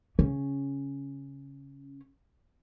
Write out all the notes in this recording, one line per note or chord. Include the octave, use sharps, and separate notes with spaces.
C#3 C#4